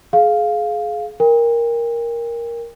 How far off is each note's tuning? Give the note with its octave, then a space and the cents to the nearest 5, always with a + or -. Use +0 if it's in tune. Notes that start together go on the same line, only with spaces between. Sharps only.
G#4 +30 F5 +0
A#4 +5 G5 +40